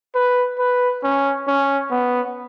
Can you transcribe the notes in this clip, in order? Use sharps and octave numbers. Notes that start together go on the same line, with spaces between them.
B4
B4
C#4
C#4
B3